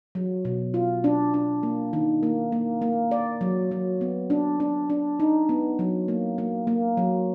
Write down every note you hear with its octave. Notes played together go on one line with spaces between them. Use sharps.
F#3
B2
F4
D4
D4
A#3
D#3
A#3
A#3
A#3
D5
F#3
F#3
B3
D4
D4
D4
D#4
B3
F#3
A#3
A#3
A#3
F#3